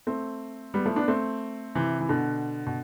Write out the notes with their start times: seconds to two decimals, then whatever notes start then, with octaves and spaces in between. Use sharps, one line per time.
0.07 A3 C4
0.74 G3 B3
0.86 F3 A3
0.96 B3 D4
1.08 A3 C4
1.75 C3 E3
2.01 E3
2.09 B2 D3
2.67 B2